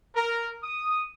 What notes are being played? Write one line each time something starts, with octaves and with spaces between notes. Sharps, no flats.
A#4
D#6